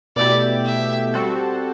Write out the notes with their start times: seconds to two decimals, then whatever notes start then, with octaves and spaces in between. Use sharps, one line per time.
0.16 B2 A3 E4 G4 D5
0.65 E5
1.14 G3 C4 F#4 A4